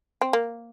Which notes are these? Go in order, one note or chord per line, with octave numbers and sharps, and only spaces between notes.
C4
A#3